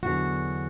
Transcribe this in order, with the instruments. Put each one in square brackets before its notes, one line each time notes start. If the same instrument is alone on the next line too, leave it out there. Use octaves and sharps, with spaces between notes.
[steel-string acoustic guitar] E2 D3 F#3 F#4